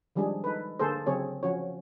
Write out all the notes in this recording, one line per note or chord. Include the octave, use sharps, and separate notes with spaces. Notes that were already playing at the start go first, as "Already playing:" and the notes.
D#3 F3 G3 G#3 D4 G#4
D#4 A4 B4
D3 A#3 G#4 A4 C5
C#3 F#3 C4 G#4 C#5
F3 C#4 F#4 C#5